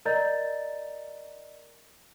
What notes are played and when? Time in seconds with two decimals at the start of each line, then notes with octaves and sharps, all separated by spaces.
0.05 A#4 D5 D#5 A#5 G6 A6